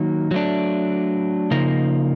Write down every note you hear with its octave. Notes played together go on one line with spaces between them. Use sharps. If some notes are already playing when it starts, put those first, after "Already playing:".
Already playing: D#3 F#3 A#3 D#4
F#3 A3 D4
C#3 F3 A#3 D#4